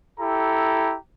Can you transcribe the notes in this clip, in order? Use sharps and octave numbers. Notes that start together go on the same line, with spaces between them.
E4 G4 A4 A#5